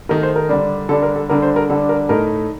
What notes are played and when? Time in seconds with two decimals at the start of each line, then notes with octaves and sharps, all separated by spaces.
0.09 D#3 A3 D#4 A#4
0.23 C5
0.36 A#4
0.49 D3 G3 D4
0.89 D3 G3 D4 A4
1.03 A#4
1.16 A4
1.29 D3 G3 D4 A#4
1.42 C5
1.56 A#4
1.69 D3 G3 D4 A4
1.89 A#4
2.09 A2 A3 D#4 A#4